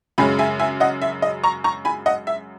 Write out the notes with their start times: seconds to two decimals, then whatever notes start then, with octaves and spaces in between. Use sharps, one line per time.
0.18 F#2 C#3 G#3 C#4 G#5 B5
0.39 E5 G#5
0.59 E5 G#5
0.80 D#5 F#5
1.02 E5
1.22 D#5
1.44 A#5 C#6
1.64 A#5 C#6
1.85 G#5 B5
2.06 D#5 F#5
2.27 E5